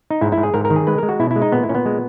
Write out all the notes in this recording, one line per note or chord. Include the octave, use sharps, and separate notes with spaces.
D#4
G#2 E4
E4
G#2
G#4
G#2 A#4
A#4
D#3
G#4
G#3 B4
G#3 A#4
F#4
B2 E4
E4
G#3
D#4
A#2 B3
E4
A#2 C#4
B3
G#3